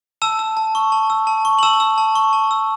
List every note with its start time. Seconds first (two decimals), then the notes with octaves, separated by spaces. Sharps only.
0.22 A5 E6 E7
0.39 E6
0.57 A5
0.75 C#6
0.92 A5
1.10 E6
1.27 A5
1.45 C#6
1.59 F#7
1.63 A5 E6 E7
1.80 E6
1.98 A5
2.15 C#6
2.33 A5
2.51 E6